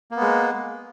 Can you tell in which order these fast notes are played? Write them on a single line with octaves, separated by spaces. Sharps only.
A#3 B3 G#3